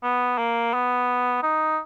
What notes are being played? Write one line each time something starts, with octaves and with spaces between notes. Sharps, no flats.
B3
A#3
B3
D#4